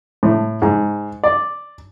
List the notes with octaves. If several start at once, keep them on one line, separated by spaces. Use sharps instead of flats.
A2
G#2
D5